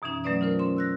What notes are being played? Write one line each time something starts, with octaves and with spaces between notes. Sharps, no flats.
F#2 B2 E3 C#4 D#4
F#3 A3 C#4 B4 D5 D#6
D#4 F4 A#4 C5
C#4 C6
E6 F#6 A#6